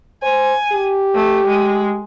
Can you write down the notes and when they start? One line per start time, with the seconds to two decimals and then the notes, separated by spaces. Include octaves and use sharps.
0.22 C5 G#5
0.72 G4
1.15 A3
1.47 G#3